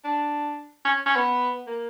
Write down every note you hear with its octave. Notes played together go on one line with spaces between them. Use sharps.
D4
C#4
C#4
B3
A#3